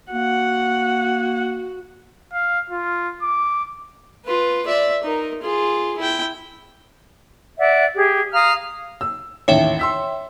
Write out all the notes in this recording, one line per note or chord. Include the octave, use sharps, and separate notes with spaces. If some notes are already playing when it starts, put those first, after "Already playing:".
A#3 F#4 F#5
F5
F4
D6
F4 B4
D5 E5
D#4 A#4
F4 G#4
E4 G5
D5 E5 F#5
G4 G#4
F5 A#5 D#6 F6
E6
A1 D#2 C#5 E5 G5
C6 E6 B6